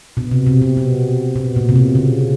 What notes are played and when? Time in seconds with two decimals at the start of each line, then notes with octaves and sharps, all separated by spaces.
0.17 B2
0.31 C3
0.47 C3
0.62 B2
0.77 B2
1.36 B2
1.56 A#2
1.69 C3
1.76 B2
1.95 C#3